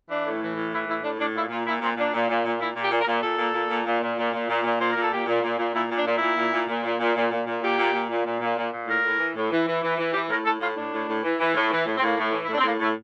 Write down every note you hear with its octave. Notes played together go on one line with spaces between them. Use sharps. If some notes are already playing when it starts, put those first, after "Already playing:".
E3 D4
A2
E3
A2
E3 E4
A2 E4
A2 D4
A2 D4
A#2 E4
A#2 F4
A#2 E4
A#2 C4
A#2 D4
A#2
A#2
A#2
A#2 E4
A#2
G4
A#2
A#4
A#2
A#2 A4
A#2
A#2
A#2
A#2
A#2
A#2
A#2
A#2
A#2
A#2 C5
A#4
A#2 A4
A#2 G4
A#2
A#2
A#2
A#2 E4
A#2 D4
A#2
E4
A#2
A#2
A#2
A#2
A#2
A#2
A#2
A#2
A#2
A#2 G4
A#2
A#2
A#2
A#2
A#2
A#2
A#2
A2 A#4
A2
E3
A2
E3
E3
E3
E3
E3 G4
A2 A#4
A2 A4
A2 F4
A2 D4
A2
A2
E3
E3
A2
E3
A2
C4
A2 A#3
A2
E3
E4
A2 D4
C4
A2 A#3
A2 A3